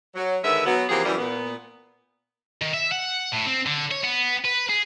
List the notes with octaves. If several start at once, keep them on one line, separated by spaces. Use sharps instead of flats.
F#3
D3 D#3 G#3 B4 E5
F#3 B3
C3 E3 F3 A#3 G4 G#4
F#2 E3 G3
A#2 B3
D#3
E5
F#5
A2
C4
D3
C#5
B3
B4
G#4